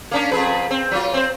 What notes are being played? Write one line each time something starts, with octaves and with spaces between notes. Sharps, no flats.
A#3 C#4 D4
F2 G#4 B4
C4
F#3 F4
C4 C5